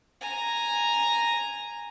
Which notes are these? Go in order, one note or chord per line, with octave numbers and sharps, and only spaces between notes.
G#5 A#5